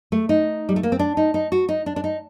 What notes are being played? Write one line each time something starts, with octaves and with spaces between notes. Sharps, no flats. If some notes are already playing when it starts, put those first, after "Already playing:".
A3
D#4
G3
A3
A#3
C4
D4
D#4
D#4
F#4
D#4
D4
D4
D#4